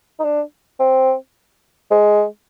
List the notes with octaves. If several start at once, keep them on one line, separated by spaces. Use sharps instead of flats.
D#4
D4
C4
G#3